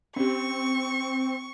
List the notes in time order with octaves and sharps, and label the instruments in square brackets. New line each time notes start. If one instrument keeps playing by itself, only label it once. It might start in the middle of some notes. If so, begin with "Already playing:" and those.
[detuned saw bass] C4 [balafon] C#4 G4 [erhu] C#6